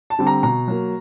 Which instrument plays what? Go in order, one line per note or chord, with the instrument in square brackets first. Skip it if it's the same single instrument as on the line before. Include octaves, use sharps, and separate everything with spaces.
[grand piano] A5
D3 G3 C4
A#5
B2 A#5
F#3 A#3